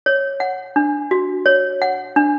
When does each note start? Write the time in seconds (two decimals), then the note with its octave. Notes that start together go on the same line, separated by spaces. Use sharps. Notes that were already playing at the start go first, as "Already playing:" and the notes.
0.06 C#5
0.40 F#5
0.76 D4
1.11 F#4
1.46 C#5
1.82 F#5
2.16 D4